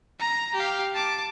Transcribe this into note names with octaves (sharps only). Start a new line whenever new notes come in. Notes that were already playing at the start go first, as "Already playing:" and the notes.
A#5
G4 F5
A5 D6